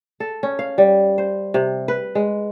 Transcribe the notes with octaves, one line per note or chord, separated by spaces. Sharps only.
A4
C#4
F5
G3
C5
C3
B4
G#3